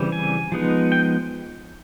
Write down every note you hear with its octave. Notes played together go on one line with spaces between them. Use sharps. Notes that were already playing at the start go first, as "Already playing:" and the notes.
Already playing: C#3 E3 G3 C4
G#5
F3 G#3 B3 D#4
G5